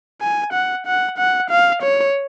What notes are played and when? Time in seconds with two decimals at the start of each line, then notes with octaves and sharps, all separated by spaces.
0.21 G#5
0.53 F#5
0.86 F#5
1.18 F#5
1.50 F5
1.82 C#5